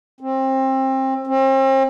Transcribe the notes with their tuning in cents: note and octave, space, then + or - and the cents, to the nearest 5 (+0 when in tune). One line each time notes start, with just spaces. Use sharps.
C4 +25
C4 +40